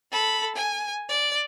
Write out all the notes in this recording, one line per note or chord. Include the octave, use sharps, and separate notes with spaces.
A4 B5
G#5
D5